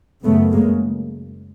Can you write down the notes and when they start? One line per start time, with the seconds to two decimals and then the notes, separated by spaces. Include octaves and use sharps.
0.23 F#2 C#3 A3 B3
0.52 G#3 A#3